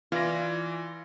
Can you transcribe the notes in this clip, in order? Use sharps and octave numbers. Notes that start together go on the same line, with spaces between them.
E3 F4 D5 A#6